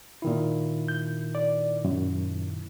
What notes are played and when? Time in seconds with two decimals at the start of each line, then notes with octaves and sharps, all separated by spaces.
0.22 A#2 D#3 E4
0.88 G6
1.35 D5
1.85 F#2